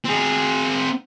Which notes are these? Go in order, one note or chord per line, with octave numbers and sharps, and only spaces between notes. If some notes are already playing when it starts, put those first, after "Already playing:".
C4 G#4